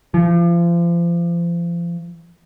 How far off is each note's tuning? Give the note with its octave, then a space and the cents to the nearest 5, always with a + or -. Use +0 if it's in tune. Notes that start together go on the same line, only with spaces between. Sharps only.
F3 -35